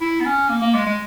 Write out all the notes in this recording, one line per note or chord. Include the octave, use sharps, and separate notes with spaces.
E4
B3
C#4
A#3
A#3
G#3
G#3